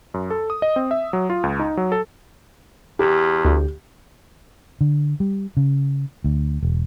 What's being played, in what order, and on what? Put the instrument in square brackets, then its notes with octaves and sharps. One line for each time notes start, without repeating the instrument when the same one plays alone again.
[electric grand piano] F#2
A4
D#6
D#5
C4
E5
F#3
F4
C#2
D#4
F#3
A4
[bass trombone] E2 [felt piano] G4
[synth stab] D2
[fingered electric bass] D3
G3
C#3
D2
E1